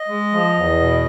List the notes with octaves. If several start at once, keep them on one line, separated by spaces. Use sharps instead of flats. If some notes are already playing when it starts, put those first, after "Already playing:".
Already playing: D#5
G#3
F3
E2
B2